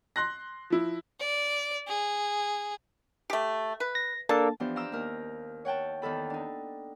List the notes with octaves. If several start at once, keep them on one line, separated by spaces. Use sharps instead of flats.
C6 F#6 A#6
F3 E4
D5
G#4
A3 G4
B4
A#6
A#3 D4 A4 A5
E3 F3 B3 D4 G4 C5
F5 A#5 D6 E6 G6
D#2 A#4
C#5 F#5 G5 A5
E2 D#3 A4 B5
D4 D#4